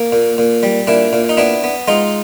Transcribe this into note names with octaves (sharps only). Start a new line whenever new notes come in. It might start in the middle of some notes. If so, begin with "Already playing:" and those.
Already playing: A#3
A#2
A#2
G3
A#2 D4 E4
A#2
D#4
B3 D4 E4
B3
G#3 D#4 F4